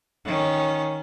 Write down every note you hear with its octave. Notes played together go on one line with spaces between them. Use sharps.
D#3 C#4